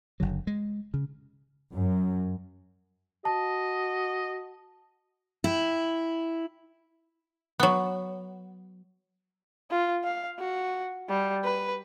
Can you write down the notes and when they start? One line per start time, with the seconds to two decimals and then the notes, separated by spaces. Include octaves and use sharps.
0.20 F#1 D3 F#3
0.47 G#3
0.94 C#3
1.71 F#2
3.25 F#4 D#5 A5
5.44 E4 G5
7.60 F#3 B3
9.71 F4
10.04 F5
10.39 F#4
11.09 G3
11.44 B4